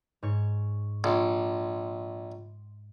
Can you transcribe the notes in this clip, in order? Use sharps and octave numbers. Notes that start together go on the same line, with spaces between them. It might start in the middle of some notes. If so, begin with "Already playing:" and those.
G#2 C#5
A#1 C6 D6 C#7